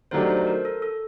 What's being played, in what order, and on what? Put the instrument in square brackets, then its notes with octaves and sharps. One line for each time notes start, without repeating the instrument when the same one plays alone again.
[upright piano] D#3 F#3 A3 D4 G4 [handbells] C5
[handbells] C5
A#4
A4
A4